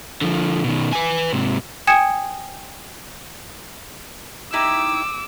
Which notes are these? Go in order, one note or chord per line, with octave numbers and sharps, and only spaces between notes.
D3 F3
B2 D#3
B4 G#5
G#2 C3
G5 G#5 D#6 G#6 C#7 E7
D#4 E4 G4 D6 E6